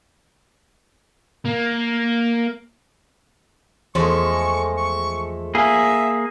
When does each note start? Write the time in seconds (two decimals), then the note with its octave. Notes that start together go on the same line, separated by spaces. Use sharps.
1.46 A#3
3.95 E2 F3 G#3 A3 A4 C#6
4.77 C#6
5.55 A#3 G#4 E5